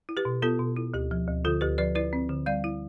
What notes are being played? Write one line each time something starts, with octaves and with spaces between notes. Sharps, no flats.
E4
G4 B4
B2
B3 F4 A4
B2
E4
D2 G4
F3
D2
D3 F4 A4
D2 G4 B4
F3 B4 D5
E4 B4 D5
C4
D3
G3 D5 F5
E4